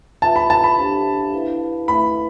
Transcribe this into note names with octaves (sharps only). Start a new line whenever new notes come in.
F4 B4 E5 A5
B5
A5
B5
D4 G4 C5 E5
E4 B4 F5
A3 E4 B4 E5 B5